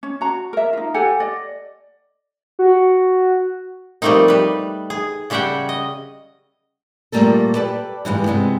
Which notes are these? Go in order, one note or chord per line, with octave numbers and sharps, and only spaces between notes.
C#4
F#4 A#5
A#4 E5
D#4 F4
G4 A4 F#5 G#5
D5 D#5
F#4
F3 G3 A3 A#3 C4 D#4
G3 B4
G#4
C#3 G3 C#4 E5 F#5 G5
D#5
A#2 D3 G3 A3 A#3 A4
G4 A4 B4 D5
G2 E3 F3 G3 G#3
C3 G#3 B3